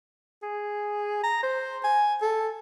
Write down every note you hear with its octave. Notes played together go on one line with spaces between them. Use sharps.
G#4
A#5
C5
G#5
A4